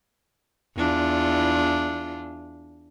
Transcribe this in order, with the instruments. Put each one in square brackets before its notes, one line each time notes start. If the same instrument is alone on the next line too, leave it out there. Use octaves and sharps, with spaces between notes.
[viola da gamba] E2 D4 F4